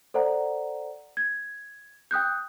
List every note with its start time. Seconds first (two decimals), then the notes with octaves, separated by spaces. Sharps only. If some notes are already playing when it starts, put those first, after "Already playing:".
0.14 A4 C5 D5 F#5 A#5
1.17 G#6
2.11 G5 D#6 F#6 G6